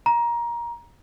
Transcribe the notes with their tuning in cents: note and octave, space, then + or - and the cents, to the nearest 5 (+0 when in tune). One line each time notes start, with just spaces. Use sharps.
A#5 +20